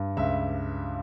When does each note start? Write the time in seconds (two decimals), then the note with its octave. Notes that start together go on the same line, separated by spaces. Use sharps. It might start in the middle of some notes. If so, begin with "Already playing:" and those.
Already playing: G2
0.17 C#2 E5